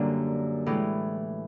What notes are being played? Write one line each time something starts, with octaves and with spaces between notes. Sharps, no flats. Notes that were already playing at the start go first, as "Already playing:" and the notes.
Already playing: F#2 D3 G3 A#3 D4
A2 E3 G#3